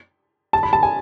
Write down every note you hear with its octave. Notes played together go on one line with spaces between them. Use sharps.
A5
B5
A5
G#5